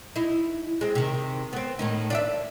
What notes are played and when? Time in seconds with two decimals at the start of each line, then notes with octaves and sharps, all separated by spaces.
0.16 D#4 E4
0.81 G#3 C4
0.95 C3 D#3
1.53 B3 C4
1.79 A2 D#3 D#4
2.10 D4 F4 E5